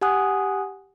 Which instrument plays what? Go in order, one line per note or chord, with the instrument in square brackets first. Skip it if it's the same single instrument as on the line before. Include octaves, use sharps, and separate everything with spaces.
[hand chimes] G4 F#5 G#5 D#6 F#6